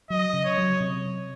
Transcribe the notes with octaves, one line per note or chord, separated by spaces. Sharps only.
F#3 D#5
C#3
C#5
F#3
C3